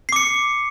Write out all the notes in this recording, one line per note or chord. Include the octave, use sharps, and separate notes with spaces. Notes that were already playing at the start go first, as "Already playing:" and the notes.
D6 C7 C#7